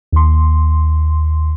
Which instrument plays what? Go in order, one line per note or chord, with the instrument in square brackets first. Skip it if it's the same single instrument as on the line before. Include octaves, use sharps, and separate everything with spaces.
[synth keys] D#2 C6